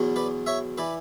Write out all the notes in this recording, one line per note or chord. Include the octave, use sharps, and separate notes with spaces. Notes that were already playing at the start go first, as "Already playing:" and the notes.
Already playing: E2 B2 F#3
B4 D5
C#5 E5
E3 B4 D5